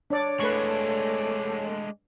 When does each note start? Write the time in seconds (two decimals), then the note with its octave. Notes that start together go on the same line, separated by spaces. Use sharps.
0.10 D4 C#5 D5
0.40 G#3 A3 D4 B4 C#6